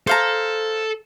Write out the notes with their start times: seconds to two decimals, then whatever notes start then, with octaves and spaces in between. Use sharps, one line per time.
0.07 A4 C5 F5 A#5